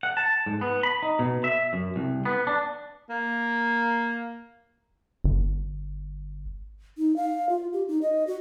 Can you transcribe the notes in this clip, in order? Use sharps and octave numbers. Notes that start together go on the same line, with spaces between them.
F#5
A5
G#2
B3
B5
D#4
B2
E5
F#2
C2
B3
D4
A#3
G1
D#4
F5
F4
G4
D#4
D#5
F#4